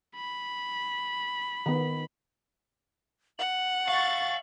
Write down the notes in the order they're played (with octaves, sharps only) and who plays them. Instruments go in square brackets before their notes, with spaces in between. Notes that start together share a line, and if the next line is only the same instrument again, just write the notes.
[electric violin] B5
[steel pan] D#3 B3
[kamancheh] F#5 [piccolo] F#7
[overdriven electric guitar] E5 F5 [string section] C#6 A6